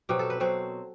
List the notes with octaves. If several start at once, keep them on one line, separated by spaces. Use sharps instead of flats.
B2 F#3 C4 G4
A4
B4
B2 F#3 C4 C5